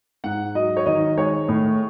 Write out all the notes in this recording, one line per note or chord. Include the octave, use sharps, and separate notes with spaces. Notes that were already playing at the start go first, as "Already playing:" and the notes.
G#2 F#5
F#3 D#5
C#5
D#3 D#5
G#3 C#5
A2